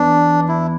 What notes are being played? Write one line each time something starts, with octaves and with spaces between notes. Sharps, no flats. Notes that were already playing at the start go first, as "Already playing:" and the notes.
Already playing: E2 D4
E4